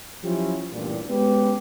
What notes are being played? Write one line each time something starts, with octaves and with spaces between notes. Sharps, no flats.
F3 F#3 C#4 E4 F4 G4
A1 G2 A#2
G#3 B3 C#4 G4 B4